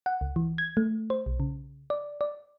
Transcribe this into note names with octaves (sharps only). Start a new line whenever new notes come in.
F#5
C#2
E3
G#6
A3
C5
B1
C#3
D5
D5